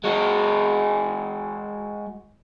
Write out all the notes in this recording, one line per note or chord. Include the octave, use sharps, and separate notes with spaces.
G#3 F#4